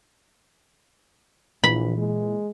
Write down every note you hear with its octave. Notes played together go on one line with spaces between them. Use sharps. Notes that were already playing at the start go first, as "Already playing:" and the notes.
A#1 A#2 E3 B5
G#3